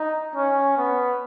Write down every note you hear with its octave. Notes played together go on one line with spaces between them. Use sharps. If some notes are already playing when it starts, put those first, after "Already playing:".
Already playing: D#4
C#4
B3